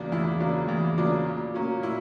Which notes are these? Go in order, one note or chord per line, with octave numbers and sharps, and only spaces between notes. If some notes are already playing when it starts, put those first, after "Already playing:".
Already playing: E2 C#3 F#3 A#3 D4
E2 E4
C#3 F#3 A#3 D4
E2
C#3 F#3 A#3 D4
A#2
F#3 A#3 C#4
A#2 E4